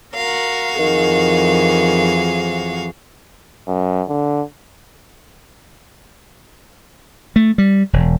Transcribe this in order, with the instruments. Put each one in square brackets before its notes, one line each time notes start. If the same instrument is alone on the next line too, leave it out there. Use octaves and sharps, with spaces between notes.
[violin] F#4 F5 [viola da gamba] A#4
[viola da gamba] F2 E3 G#4 [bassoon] D#3
[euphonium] F#2
D3
[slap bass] A3
G3
E1